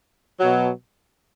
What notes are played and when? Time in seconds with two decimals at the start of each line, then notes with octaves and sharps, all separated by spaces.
0.39 B2 F#3